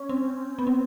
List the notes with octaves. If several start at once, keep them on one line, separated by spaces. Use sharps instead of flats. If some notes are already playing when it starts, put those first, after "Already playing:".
Already playing: C#4
C4
B3
C4